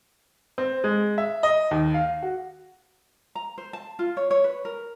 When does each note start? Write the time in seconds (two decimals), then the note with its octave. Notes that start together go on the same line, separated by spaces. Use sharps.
0.58 C4
0.84 G#3
1.18 E5
1.43 D#5
1.71 D#2
1.94 F5
2.23 F#4
3.35 A#5
3.58 C5
3.73 A5
3.99 F4
4.17 C#5
4.31 C#5
4.44 B4
4.65 A#4